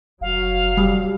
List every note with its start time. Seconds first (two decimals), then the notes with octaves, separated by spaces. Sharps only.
0.21 F#1 F#3 F5
0.77 F1 G3